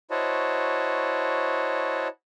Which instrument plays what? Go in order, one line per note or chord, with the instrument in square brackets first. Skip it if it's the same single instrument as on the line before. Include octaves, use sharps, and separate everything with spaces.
[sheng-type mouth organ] E4 F#4 C5 C#5 D#5 A5